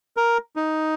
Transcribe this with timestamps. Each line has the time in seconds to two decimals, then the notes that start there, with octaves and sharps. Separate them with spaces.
0.17 A#4
0.56 D#4